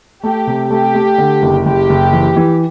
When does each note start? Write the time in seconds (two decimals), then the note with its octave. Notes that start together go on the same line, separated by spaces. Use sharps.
0.23 A3 G4
0.47 C3
0.71 A3 G4
0.95 A3
1.18 D3
1.42 F#1
1.65 F#1 G4
1.89 F#1
2.13 E3
2.36 E3